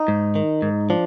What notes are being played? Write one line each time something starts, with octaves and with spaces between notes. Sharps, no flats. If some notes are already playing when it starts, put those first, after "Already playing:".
Already playing: D#4
G#2
D#3
G#2
F3 D4